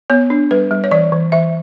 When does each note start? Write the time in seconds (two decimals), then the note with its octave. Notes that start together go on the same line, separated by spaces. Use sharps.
0.10 B3 C#5
0.30 D4
0.51 G3 B4
0.71 G3
0.84 C#5
0.91 E3 D5
1.12 E3
1.32 E3 E5